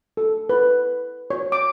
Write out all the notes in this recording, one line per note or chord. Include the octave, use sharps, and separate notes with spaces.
A4
B4
C#5
D6